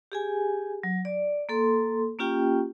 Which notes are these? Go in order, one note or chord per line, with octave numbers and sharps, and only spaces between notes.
G4 G#4 G#5
F#3
D5
A#3 A4 C6
A#3 C#4 F4 G4 G5